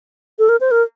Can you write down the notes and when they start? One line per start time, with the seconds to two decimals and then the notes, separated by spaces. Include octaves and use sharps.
0.39 A4
0.49 A#4
0.61 C5
0.71 A#4